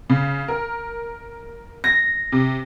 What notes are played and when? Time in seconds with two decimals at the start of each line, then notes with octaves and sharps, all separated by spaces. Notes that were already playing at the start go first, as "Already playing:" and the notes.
0.10 C#3
0.48 A#4
1.84 A#6
2.32 C3